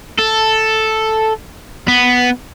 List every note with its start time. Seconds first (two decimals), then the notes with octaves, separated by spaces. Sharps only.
0.18 A4
1.88 B3